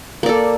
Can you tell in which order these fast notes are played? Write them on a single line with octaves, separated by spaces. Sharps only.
A#3 D5 A4